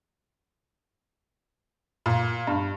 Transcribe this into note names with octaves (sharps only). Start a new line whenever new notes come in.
A#2
G2